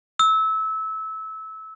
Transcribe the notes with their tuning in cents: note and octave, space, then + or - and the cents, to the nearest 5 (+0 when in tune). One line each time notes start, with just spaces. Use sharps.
E6 -25